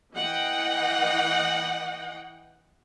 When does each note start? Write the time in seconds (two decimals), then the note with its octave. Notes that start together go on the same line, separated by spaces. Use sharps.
0.15 E3 D#5 F#5 G5